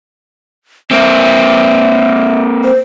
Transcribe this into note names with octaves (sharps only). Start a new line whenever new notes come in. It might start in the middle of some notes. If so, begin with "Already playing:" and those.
A#3 C4 E5
C5